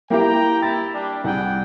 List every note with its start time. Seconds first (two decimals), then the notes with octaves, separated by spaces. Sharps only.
0.10 A#3 E4 G4 G5 A#5
0.62 E4 A6
0.93 G3 D4
1.24 C2 G#4 F#5 G5